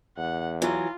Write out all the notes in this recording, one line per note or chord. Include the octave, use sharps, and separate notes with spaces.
E2 F#5
E3 F#3 F4